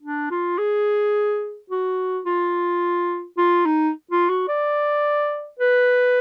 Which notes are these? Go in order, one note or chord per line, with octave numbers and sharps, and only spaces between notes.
D4
F4
G#4
F#4
F4
F4
D#4
F4
F#4
D5
B4